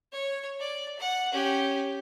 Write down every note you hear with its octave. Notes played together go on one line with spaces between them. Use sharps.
C#5
D5
F#5
C#4 G4